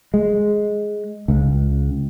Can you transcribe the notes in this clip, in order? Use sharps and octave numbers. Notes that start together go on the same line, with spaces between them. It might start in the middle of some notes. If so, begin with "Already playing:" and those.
G#3
C#2